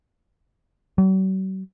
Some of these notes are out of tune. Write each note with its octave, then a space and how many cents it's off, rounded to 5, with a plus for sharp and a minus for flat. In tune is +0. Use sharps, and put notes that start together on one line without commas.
F#3 +45